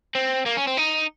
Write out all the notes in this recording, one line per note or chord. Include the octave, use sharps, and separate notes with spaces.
C4
A#3
C#4
C4
D#4